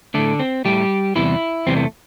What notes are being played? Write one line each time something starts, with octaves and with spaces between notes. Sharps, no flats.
A2 D3 A3 D4
C4
A2 G3 A3 G4
E2 C3 E3 G3 E4
E2 C3 E3 G3 C4
A3